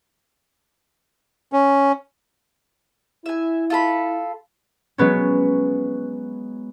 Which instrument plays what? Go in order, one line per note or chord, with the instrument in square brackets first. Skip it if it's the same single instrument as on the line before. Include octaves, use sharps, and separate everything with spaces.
[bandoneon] C#4
[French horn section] E4 [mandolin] E5 G#5
[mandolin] F4 A4 B5
[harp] F#3 G#3 B3 C#4